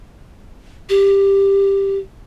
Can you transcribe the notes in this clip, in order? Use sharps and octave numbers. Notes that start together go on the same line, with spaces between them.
G4